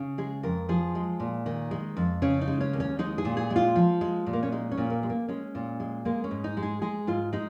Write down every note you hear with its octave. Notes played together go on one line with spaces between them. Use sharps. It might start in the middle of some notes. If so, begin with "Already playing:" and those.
Already playing: C#3
G#3 G#4
F2 A#4
F3 G#4
G#3
A#2
D#3
G#3
F2
C#3 C#4
D#4
G#3
C#4
D#2
C#4
G#3 D#4
G#4
A#2
G#4
G#3
F4
F3
G#3
A#2
A#3
C#4
G#3 D#4
C#4
A#2
A#3
G#3
A#3
G#3 C#4
A#2
G#3
G#3 A#3
C#4
G#2
D#4
G#3
G#4
G#3 G#4
G#2 F4
G#3 D#4